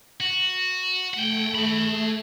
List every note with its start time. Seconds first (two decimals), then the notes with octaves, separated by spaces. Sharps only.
0.20 F#4
1.14 A3 F#5 G5
1.55 G#4 B5